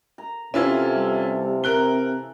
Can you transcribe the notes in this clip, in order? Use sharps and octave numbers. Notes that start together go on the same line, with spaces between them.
A#5
C3 E3 C#4 E4 F4 A4 F5
G3
C4 A#4 F#6 G7